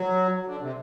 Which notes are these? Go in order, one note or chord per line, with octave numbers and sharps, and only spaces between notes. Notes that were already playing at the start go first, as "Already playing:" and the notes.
Already playing: F#3
D3
C3